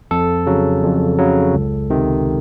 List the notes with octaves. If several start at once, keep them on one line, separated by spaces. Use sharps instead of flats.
F2 A4
C#3 F#3
F2
C#3 F#3
C#2
C3 D#3